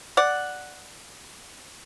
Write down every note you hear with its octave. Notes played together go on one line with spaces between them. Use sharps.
D5 F#5